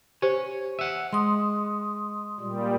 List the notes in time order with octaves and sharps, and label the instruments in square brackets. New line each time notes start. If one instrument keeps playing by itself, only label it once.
[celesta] G4 C5 [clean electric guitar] C#5 G#5
[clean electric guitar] E5 F#5 [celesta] D#7
[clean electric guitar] G#3 [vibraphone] C6 D#6
[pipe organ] A#2 G3